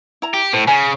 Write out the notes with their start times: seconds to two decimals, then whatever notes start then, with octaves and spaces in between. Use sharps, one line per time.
0.22 E4 A#5
0.34 G4
0.53 A2 C5
0.67 C#3 C#5 G#5